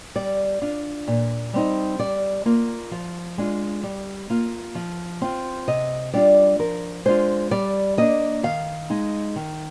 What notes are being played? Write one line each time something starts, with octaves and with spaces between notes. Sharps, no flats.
G3 D5
D4 F4
A#2
G3 C4 D#4
G3 D5
A#3 F4
F3
G#3 D4 F4
G3
A#3 F4
F3
C4 F4
C3 D#5
G3 D4 F4 D5
F3 A#4
G#3 D4 F4 C5
G3 D5
A#3 D4 D#5
D#3 F5
G#3 D#4
D#3